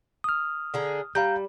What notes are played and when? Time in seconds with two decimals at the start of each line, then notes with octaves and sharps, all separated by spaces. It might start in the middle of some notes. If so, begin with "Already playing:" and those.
0.24 D#6 F6
0.74 D3 G#4 A#5
1.15 G3 F5 A#5 G6